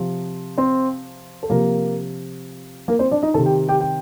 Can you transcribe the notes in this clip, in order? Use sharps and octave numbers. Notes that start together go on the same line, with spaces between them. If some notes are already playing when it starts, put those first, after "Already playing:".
Already playing: C3 F3
C4 C5
A4
C3 F3 A#3 A#4
A#3 A#4
C4 C5
D4 D5
D#4 D#5
C3 D#3 A4 A5
G4 G5
G4 G5
G4 G5